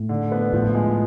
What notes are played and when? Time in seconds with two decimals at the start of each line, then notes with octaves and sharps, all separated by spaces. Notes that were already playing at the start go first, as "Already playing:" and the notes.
Already playing: A2
0.09 D3
0.32 B3
0.53 A2 F3
0.75 G#3